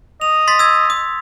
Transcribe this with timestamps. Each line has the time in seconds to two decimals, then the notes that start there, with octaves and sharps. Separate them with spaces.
0.21 D#5 F7
0.48 C6 A6 B6
0.59 E6 G#6
0.90 D#6